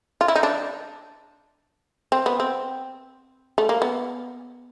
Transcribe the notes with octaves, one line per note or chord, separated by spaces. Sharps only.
F4
E4
D#4
D4
C4
B3
C4
A3
A#3
B3